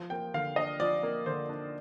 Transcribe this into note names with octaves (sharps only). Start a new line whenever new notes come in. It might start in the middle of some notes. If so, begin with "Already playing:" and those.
Already playing: F3
A#3 G5
D3 F5
D4 D#5
F3 D5
A#3
D3 C5
D4